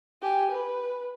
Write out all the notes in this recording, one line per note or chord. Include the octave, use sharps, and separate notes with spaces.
G4 G#5
B4